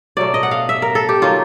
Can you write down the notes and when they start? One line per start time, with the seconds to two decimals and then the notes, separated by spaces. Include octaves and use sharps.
0.17 B2 F#3 A3 D5
0.34 D#5
0.43 F#5
0.51 F5
0.69 E5
0.82 A#4
0.95 A4
1.09 G4
1.21 D#3 F#3 A#3 F4